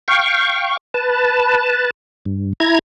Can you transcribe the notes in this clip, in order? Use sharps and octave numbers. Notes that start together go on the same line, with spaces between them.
F5 G5 C#6
B4 A5
G2
E4 A#5 G#6